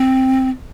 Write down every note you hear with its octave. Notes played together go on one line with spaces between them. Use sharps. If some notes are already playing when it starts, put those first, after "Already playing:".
Already playing: C4